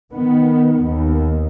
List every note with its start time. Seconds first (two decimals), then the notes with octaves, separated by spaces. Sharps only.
0.12 D#3 B3
0.83 D#2